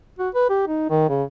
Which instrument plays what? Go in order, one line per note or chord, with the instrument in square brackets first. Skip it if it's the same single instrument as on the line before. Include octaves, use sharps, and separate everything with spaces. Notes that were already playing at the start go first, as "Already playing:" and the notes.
[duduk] F#4
B4
G4
D#4
D#3
C#3